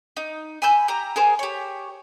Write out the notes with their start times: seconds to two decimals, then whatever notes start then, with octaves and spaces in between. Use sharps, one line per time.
0.17 D#4
0.62 G#5 B5 E6 G6
0.88 G4 A#5
1.16 G#4 A#4 C5
1.39 G4 C#5